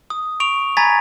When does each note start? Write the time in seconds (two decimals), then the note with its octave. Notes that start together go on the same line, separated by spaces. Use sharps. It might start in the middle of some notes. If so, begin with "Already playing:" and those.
0.10 D#6
0.40 C#6 D7 F7
0.77 G#5 A#5 B5 G#6 A6 B6